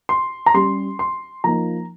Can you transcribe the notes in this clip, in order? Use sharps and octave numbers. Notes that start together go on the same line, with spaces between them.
C6
A#5
G3 C#4 G4 C6
C6
F3 A#3 D#4 A#5